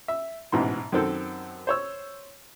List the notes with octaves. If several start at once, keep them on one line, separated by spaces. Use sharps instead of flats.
E5
A1 G#2 B2 E3 C6
F#2 D#3 C4 A4
C5 C#5 E6